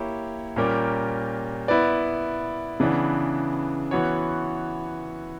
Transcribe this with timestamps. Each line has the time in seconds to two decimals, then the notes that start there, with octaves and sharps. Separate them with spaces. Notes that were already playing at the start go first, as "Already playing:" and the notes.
Already playing: A#3 E4 G4 C#5
0.56 A#2 G3 C#4 G4 A#4
1.68 B3 E4 B4 D5
2.80 C#3 E3 B3 D4
3.91 E3 B3 F#4 C#5